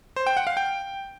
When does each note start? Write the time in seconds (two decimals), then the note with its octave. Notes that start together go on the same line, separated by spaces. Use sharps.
0.16 C5
0.27 G5
0.37 F#5
0.47 F5
0.57 G5